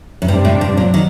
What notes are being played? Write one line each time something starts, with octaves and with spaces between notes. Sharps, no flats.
F#2
G2 C3 G3 D4
A2
G2
A#2 F#3
D#3